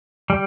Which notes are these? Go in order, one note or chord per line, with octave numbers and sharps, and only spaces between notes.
G3